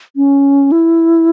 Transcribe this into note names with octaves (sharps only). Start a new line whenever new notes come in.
C#4
E4